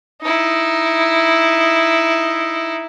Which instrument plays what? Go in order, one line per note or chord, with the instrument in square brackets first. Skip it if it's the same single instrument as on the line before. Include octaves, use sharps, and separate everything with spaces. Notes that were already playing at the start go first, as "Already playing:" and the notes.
[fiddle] D#4 E4